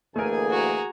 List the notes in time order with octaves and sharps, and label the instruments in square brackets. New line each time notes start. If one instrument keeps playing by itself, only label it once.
[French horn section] D2 E3 A#3 [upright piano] A3 A#4 [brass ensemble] G#4 G#5
[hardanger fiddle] F#4 A#5